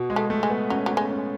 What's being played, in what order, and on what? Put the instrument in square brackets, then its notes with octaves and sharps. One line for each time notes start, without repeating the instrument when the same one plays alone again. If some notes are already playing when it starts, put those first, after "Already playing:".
Already playing: [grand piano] B2
G#3
[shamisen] A3
[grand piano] A3
[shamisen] G#3
[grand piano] B3
[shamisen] F#3 [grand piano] C#4
[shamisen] F#3
[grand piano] B3
[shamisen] G#3
[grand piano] C#4